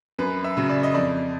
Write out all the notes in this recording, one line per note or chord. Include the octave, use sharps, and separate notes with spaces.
F#2 B4
E5
C#3 F#3
D5
D#5
F2 D5